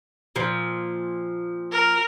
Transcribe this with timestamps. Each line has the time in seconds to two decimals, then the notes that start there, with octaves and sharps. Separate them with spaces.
0.36 A#2 F3
1.72 A#4